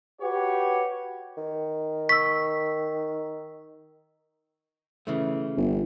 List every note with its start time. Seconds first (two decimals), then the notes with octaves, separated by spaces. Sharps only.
0.21 F#4 G4 B4 C#5
1.38 D#3
2.09 C#6 E6 B6
5.07 C#3 E3 A3
5.57 G1